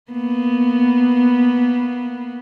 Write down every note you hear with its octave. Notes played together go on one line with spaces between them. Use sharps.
A#3 B3